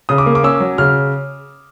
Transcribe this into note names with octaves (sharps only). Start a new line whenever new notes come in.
C#3 D#6
D6
A#3
D6
C#4 E6
F#3
C#3 F6